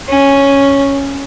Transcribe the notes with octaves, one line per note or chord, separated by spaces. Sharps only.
C#4